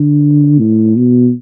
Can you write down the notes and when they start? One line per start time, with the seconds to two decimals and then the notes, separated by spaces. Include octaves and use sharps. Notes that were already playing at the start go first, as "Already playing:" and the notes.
Already playing: D3
0.59 A2
0.97 B2